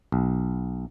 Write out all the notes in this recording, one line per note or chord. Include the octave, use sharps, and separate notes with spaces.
B1